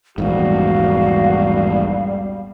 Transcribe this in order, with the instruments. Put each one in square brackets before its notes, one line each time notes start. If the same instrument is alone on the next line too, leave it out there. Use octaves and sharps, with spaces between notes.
[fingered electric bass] A#1 E2 G#2 [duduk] G3 [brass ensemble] F#4 [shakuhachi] F5
[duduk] G3